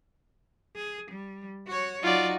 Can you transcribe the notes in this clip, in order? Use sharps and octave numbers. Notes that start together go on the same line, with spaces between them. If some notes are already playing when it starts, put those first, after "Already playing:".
G#4
G3
F#4 C#5
F#3 D#4 F4 F#4 D5